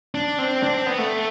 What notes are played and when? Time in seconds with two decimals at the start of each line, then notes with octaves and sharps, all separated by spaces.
0.15 D4
0.39 C4
0.63 D4
0.74 C4
0.86 B3
0.98 A3